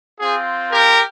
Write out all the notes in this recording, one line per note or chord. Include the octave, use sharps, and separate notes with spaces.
C4 F4 G#4
G4 A#4